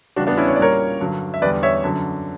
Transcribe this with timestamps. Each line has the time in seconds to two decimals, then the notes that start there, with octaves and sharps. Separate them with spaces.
0.16 E2 C#3 G3 D4 F#4
0.27 B3 D4
0.37 C#4 E4
0.48 C#5
0.56 D5
0.58 A#2 G3 A#4 C#5
1.00 G2 D3 F#3
1.34 E5
1.42 E2 D3 G3 B4 D5
1.63 C#5 E5
1.84 F#2 D3 F#3